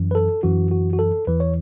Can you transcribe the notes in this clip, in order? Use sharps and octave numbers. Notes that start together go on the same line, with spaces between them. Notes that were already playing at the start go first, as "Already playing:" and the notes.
Already playing: F#2 E3
B4
A4
F#2 E3 F#4
F#4
F#4
A4
E2 E3 B4
C#5